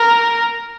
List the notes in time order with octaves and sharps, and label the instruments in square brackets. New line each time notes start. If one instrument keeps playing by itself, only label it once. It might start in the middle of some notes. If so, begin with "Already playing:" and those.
Already playing: [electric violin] A#4